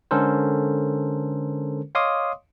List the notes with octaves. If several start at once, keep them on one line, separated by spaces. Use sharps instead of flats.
D3 G#3 C#4 A4 A#4 C5
C#5 D#5 F5 C6 D6 D#6